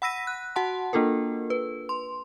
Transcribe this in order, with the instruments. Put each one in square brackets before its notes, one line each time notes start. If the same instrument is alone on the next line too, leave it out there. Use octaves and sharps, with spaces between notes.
[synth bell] F#5 B5 E6 A#6 B6 D#7
F#6
F#4 F#5 A5 C6
A#3 D4 F4 A4 A#4
B4
C6